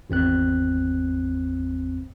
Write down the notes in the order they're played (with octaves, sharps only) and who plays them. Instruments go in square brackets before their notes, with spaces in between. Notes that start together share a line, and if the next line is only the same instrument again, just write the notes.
[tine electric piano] G#1 E2 C4 F#6